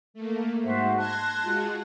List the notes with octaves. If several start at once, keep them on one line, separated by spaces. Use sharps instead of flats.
A3 A#3
G#2 F#4 C5 E5
A5 C6 F#6 G#6 A#6
G#3 F4 F#4